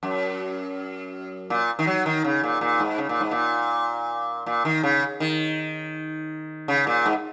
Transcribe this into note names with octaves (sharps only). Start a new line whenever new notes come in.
F#2
A#2
D#3
F#3
D#3
C#3
A#2
A#2
G#2
C#3
A#2
G#2
A#2
A#2
D#3
C#3
D#3
C#3
A#2
G#2